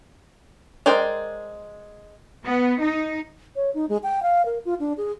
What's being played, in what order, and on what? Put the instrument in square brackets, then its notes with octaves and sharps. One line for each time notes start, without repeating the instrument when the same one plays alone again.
[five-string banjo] G#3 A#4 C5 D5 G5
[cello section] B3
D#4
[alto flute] C#5
D#4
G#3
G5
F5
A#4
F4
D4
G#4